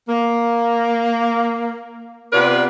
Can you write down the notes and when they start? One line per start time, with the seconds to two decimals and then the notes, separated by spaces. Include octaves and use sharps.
0.09 A#3
2.33 C3 B3 F4 B4 D5